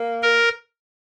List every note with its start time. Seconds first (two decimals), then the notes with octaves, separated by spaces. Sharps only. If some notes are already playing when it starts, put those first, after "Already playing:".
Already playing: A#3
0.23 A#4